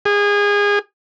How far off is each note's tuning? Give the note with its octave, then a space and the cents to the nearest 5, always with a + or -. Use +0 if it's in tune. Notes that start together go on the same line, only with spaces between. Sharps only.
G#4 -25